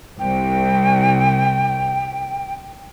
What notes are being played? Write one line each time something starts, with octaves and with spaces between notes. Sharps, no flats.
C2 G5